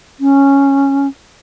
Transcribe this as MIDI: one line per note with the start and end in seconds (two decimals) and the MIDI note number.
0.20 1.08 61